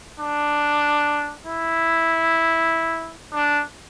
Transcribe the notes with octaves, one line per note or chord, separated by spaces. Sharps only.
D4
E4
D4